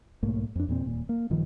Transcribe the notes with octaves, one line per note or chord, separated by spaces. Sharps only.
B1 G#2 A3 A#3
F2 D4
E2 A#2 C4
D#1 A#2
A#3
A#1 G2 D#3 F3